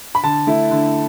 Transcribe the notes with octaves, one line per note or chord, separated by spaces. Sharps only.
B5
D3 A5
A3 E4
D3